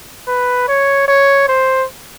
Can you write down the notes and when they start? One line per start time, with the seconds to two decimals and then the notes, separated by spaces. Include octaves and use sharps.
0.28 B4
0.68 C#5
1.08 C#5
1.49 C5